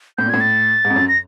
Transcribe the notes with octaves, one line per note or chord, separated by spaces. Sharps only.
A2 G6
A#2
A2 G#6
A6
G#2
F2
F#2
A#6